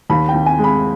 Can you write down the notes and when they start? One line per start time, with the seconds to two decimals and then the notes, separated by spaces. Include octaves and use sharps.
0.10 D#2 B5
0.29 G5
0.34 D#2
0.46 G#5
0.58 G#3
0.64 B5